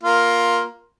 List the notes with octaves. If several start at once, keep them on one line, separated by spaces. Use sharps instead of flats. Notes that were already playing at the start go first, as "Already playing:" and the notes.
A#3 F4